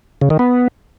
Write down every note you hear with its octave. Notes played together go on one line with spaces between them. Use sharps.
C#3
D#3
B3